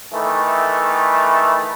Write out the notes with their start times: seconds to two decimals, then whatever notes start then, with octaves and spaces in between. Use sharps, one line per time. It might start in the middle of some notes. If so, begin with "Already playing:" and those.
0.13 D#3 E3 A3